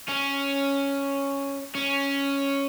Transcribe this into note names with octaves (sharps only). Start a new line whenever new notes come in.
C#4
C#4